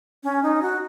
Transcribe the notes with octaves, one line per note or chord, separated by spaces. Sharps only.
C#4
D#4
F#4